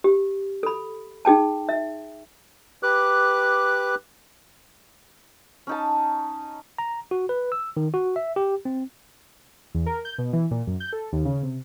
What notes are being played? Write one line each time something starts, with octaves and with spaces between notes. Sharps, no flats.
G4
A4 B5
D#4 G#4 G5 A5
E5
G4 B4 D6 F#6
C#4 D#4 A5
A#5
F#4
B4
E6
D#3
F#4
E5
G4
C4
E2
A#4
G6
B2
E3
A#2
F#2
G6
A4
D#2
C#3
C3